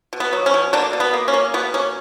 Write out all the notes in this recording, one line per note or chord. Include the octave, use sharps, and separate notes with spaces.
B2
B3
F#3
C#4
B2
D3 A#3 D4
B2
B3
A#3
C#4
A#3
B2 B3
A#3 C#4